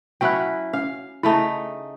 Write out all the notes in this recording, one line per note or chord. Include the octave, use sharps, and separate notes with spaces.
F#3 C#4 E4 G5 F#6
C#4 F5
C#3 A3 D#4 E4 A5